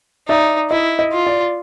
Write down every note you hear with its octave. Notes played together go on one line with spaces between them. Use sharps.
D#4 D5 E5
E4 D#5
D#5
F4
D5